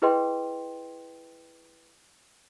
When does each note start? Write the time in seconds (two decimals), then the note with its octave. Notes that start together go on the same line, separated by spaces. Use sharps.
0.02 E4 G#4 B4 D#5 G5 C6